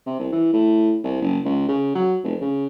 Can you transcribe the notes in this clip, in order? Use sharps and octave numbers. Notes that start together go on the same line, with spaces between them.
C3
C2
E3
A2
C2
F#1
C#2
C#3
F#3
F1
C#3